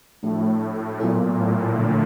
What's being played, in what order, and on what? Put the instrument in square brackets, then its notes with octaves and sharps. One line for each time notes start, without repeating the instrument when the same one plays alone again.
[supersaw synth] A2 [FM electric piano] F3 A3 D4 F#4 A4
[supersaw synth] A#2 [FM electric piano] F#3 B3 E4 A4
[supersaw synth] A2
[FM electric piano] D3 F3 A3 D4